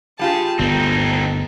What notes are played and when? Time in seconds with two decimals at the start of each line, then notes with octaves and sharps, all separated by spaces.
0.19 G3 F4 G4 G#4 A5
0.59 G1 D2 B3 C4 D#4 A4